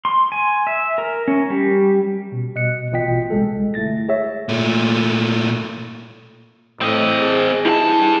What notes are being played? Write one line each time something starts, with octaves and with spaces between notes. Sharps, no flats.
C6
G#5
E5
A#4
C#4
G3
B2
B2 D#5 F#6 C#7
A1 B2 F4 D#5 G5 B6
C2 G#3 A4
G1 A3 E4 A6 A#6
G#4 C#5 E5
A#2 A3
A2 C4 D#5
G#4
G2 E4 A5